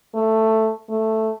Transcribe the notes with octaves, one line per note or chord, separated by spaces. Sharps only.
A3
A3